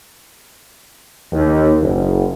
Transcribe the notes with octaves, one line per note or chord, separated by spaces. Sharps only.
D#2
F#1